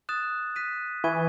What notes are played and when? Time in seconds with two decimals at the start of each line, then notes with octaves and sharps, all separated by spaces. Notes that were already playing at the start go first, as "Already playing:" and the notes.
0.09 D#6 F#6 A6 E7
0.56 F#6 B6 D#7
1.04 E3 G#5 C#6 G#6 D#7